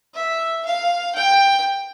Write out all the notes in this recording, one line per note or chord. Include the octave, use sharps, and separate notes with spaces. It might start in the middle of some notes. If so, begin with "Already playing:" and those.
E5
F5
G5